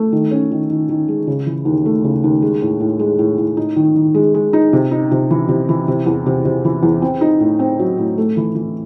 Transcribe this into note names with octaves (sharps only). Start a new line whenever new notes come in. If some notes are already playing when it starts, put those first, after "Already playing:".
Already playing: A3
D#3
C#4
D#3
D#3
D#3
G#3
C#3
E3
D#2
A3
C#3
D#2
G#3
A2
A2
G#3
A2
A2
D#4
D#3
D#3
G#3
G#3
D#4
C3
D#4
C3
E3
C3
E3
C3
E2
C3
C3
E3
E2
C4
D#4
A2
C4
F#3
A2
A3
E3
E3